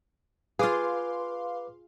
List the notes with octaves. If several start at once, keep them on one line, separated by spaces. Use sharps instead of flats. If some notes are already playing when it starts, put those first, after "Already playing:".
F4 G#4 B4 F5 C6 D6